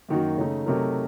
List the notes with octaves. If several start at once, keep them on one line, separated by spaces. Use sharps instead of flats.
F#2 D#3 A#3 D#4 F#4
C#3 A3 D#4
C3 F#3 A3 D#4 A#4